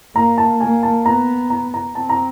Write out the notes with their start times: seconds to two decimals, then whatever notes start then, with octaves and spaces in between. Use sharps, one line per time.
0.15 A#3 A#5
0.38 A5
0.61 A#3 G#5
0.83 A5
1.05 B3 A#5
1.50 A#5
1.74 A#5
1.95 C4 A5
2.09 A#5